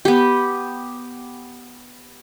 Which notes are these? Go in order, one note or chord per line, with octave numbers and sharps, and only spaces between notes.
B3 G4